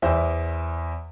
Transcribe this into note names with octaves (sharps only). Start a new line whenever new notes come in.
E2 C5 E5